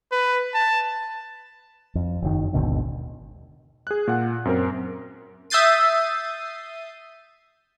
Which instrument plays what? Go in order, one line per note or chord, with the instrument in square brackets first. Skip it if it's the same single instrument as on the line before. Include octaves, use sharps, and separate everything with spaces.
[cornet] B4
A5
[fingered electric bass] F2
F#1 D#3
G#1 D#2 B2 D3
[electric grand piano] G#4 F#6
A#2 F#5
F#2 C4 A#4
[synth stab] E5 D#6 G6 A6 C7 D#7